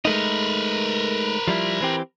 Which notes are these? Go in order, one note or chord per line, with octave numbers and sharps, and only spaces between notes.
G#3 A3 D#4 A#4 B4
F3 G3 E4
E3 C4 G4